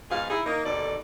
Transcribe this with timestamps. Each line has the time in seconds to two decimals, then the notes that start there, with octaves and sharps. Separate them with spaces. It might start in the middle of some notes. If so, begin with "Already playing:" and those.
0.10 G#2 B2 G#4 F5
0.29 D#4 E4 G#4
0.46 A#3 D#4
0.64 D#2 B2 D3 A4 D5